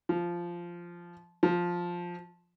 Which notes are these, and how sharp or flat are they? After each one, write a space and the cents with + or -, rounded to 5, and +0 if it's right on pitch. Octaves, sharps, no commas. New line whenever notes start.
F3 -10
F3 +5